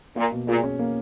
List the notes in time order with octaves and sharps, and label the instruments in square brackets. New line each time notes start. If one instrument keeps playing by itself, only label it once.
[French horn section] A#2 [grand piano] A#3
[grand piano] B2
[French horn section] A#2 [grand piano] G#4
[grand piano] C#4
A#3